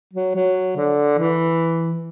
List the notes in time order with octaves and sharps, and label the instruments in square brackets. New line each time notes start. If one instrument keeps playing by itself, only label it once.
[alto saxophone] F#3
F#3
D3
E3